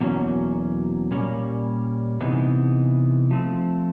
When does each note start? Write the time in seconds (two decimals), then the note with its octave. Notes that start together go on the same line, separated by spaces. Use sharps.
0.01 E2 B2 F#3 A#3 C#4
1.11 A#2 G3 A#3 C#4
2.21 C3 E3 G#3 B3 D#4
3.31 F3 A3 C4